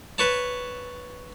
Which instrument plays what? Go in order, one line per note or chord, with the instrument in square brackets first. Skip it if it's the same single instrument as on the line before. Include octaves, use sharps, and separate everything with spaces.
[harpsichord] B4 C#5 A5